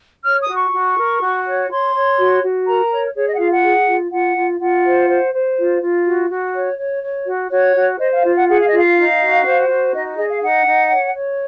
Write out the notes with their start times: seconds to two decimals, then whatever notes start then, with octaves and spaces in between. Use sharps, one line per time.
0.24 C#5 F6
0.41 D#6
0.48 F#4
0.56 C#6
0.72 F#4
0.97 A#4
1.21 F#4
1.45 C#5
1.69 C#5 C6
1.93 C#5
2.18 F#4
2.42 F#4
2.66 A#4 A#5
2.91 C#5
3.14 G#4 C#5
3.27 D#5
3.34 F#5
3.39 F4 F5
3.51 F#5
3.63 G#4
3.87 F4
4.12 F4 F#5
4.36 F4
4.60 F4 F#5
4.85 C5
5.08 C5
5.33 C5
5.57 F4
5.82 F4
6.05 F#4
6.29 F#4
6.54 C#5
6.78 C#5
7.03 C#5
7.26 F#4
7.51 F#4 C#5
7.76 F#4
7.99 C5 D#5
8.12 F5
8.23 F4
8.35 F#5
8.47 G#4 F#5
8.58 F5
8.67 D#5
8.72 F4 F5
8.96 D#4
9.21 F#4
9.45 C5
9.69 F#4
9.93 D#4 D#5
10.17 G#4 D#5
10.29 F5
10.41 D#4 F#5
10.66 D#4
10.90 C#5
11.14 C#5